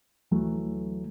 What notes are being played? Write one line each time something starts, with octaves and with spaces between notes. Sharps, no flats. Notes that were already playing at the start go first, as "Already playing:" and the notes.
D2 E3 F#3 A3